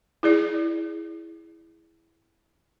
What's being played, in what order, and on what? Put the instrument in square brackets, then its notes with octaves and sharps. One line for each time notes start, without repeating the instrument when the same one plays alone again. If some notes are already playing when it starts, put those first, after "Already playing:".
[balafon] E4 G#4 D5